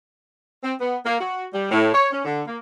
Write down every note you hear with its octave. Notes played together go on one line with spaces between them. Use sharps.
C4
B3
A#3
F#4
G3
A2
C#5
C#4
D3
A#3